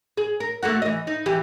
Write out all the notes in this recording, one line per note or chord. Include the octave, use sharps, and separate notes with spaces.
G#4
A#4
A3 A#3 F#4
E3 D#5
D#4
E3 G4